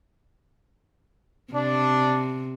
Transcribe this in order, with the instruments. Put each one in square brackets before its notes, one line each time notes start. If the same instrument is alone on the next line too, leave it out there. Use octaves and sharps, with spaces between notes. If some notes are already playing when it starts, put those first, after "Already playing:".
[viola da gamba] C3 [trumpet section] D4